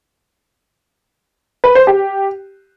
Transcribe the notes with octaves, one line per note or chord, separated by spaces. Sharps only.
B4
C5
G4